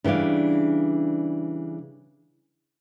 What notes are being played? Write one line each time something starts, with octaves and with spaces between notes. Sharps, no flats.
C#3 E3 G3 D4 F5